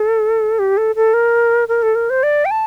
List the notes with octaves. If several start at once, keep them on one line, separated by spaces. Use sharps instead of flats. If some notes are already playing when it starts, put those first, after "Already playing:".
Already playing: A4
G4
A4
A4
A#4
A#4
A4
A#4
C5
D5
G5
A5